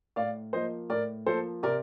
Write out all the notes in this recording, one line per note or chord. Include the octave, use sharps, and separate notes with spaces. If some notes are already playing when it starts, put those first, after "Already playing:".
A2 D5 F5
F3 A#3 C5 D#5
A2 A#4 D5
F3 A#3 A4 C5
C3 A#4 D5